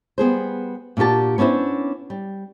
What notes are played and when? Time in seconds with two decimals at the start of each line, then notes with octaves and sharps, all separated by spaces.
0.18 G3 B3 G#4 C5
0.97 A#2 D4 F#4 G4 A5
1.38 B3 C#4 D4 E4 C5
2.10 G3